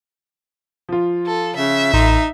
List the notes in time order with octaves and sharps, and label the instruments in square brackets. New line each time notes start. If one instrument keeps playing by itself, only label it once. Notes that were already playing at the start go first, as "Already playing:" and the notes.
[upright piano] F3 F4
[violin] A4
[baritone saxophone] C#3 [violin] E5
[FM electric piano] A1 [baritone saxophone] D#4